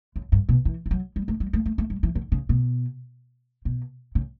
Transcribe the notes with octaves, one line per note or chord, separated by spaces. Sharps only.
F#2
G2
B2
E3
E3
F#3
G3
A3
G3
A3
A3
A3
G3
E3
D3
C#3
B2
B2
C#3